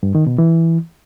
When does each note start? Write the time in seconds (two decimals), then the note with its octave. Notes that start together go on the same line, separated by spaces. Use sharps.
0.03 G2
0.15 D#3
0.27 B2
0.38 E3